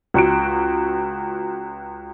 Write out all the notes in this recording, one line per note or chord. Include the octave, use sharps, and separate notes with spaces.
C#2 F#4 D7